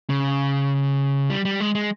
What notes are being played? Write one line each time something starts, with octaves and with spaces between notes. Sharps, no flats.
C#3
G3
G3
G#3
G#3